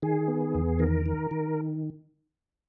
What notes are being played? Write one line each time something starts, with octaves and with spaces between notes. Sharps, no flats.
D#3 G#4
B3
E2
D#3 A#4
D#3
D#3